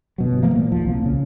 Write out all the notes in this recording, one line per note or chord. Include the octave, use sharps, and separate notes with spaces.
G1 B2 F#3
E3 F3 A3 A#3
A#2
D#2 F3
C2 A#3
C#3